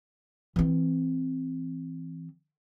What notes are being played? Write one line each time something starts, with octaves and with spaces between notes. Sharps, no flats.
E3 C4